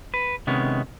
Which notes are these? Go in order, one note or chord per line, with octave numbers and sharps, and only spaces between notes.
B4
C3 D#3 G#3 B3 C#4